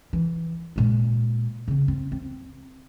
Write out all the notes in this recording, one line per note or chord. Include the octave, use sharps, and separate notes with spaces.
E3
A#2 G#3
C#3 C4
C4
C4